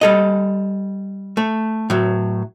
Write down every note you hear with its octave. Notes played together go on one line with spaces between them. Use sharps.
G3 A4 D#5
A3
A2 F#3